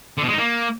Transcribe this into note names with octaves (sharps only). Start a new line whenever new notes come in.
D3
B2
G#3
D#4
A#3